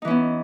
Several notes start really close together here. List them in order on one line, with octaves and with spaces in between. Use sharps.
D#4 E3 C#4 B3